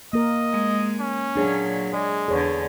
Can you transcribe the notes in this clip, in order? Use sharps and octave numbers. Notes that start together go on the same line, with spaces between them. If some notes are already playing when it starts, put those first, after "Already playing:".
A#3 A#4 D#5
G#3
C#4
A#2 F#3 D4 G#4 C#5
G#3 D5
E2 D3 G#4 C#5